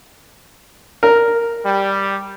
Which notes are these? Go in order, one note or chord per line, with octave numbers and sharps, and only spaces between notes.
A#4
G3